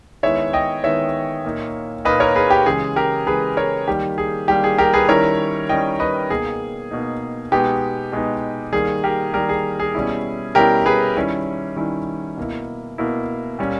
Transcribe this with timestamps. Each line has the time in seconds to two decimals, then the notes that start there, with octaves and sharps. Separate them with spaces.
0.23 D#3 G#3 B3 E4 C#5 E5
0.53 D#5 G5
0.84 D#3 G#3 B3 E4 C#5 E5
1.44 A#2 A#3 D#4
2.05 A#2 A#3 D#4 B4 D#5
2.20 A#4 C#5
2.35 G#4 B4
2.50 G4
2.66 C#3 E3 G#3 G#4
2.96 G4 A#4
3.27 C#3 E3 G#3 G#4 B4
3.57 A#4 C#5
3.88 D#3 G3 A#3 G4
4.18 G#4
4.48 D#3 G3 A#3 G4
4.64 G#4
4.78 G4 A#4
4.94 G#4 B4
5.09 D#3 G3 C#4 E4 A#4 C#5
5.69 D#3 G3 C#4 E4 D#5 G5
6.00 B4 D#5
6.30 B2 A#3 D#4 G#4
6.91 B2 A#3 D#4
7.52 B2 G#3 B3 D#4 G4
8.12 B2 G#3 B3 D#4
8.73 D#3 G3 A#3 G#4
9.04 G4 A#4
9.33 D#3 G3 A#3 G4 A#4
9.49 G#4
9.80 G#4
9.95 B2 G3 C#4 E4
10.55 B2 G3 C#4 E4 G4 A#4
10.86 G#4 B4
11.16 D#3 G3 C#4 E4
11.76 D#3 G3 C#4 E4
12.37 B2 A#3 E4
12.98 B2 A#3 E4
13.59 A#2 G3 C#4